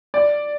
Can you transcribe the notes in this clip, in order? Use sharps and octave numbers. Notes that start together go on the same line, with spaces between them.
D5